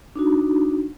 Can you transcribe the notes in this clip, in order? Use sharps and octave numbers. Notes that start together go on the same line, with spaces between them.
D4 D#4 F#4